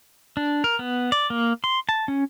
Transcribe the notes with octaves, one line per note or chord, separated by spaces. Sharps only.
D4
A#4
B3
D5
A#3
C6
A5
C#4